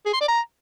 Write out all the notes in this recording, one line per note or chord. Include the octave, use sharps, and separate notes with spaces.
G#4
C6
D5
A#5